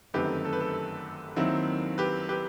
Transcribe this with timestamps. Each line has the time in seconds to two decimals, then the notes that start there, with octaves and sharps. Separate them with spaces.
0.14 G1 F#2 D#3 A3 C4 G4 B4
0.45 A4
0.53 B4
0.60 A4
1.36 D#2 D#3 F#3 C4 E4
1.98 G4 B4
2.29 G4 B4